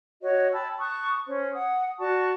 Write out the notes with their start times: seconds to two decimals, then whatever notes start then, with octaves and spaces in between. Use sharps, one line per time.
0.22 F#4 C#5 D#5
0.53 G5 A5 B5 E6
0.79 A5 C#6 D#6 F#6
1.27 C#4 C5
1.53 F#5 D#6
1.99 F#4 D5 A5 C#6